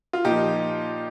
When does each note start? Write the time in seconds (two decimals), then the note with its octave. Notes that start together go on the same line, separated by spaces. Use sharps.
0.13 F4
0.25 A#2 F3 D#4 G4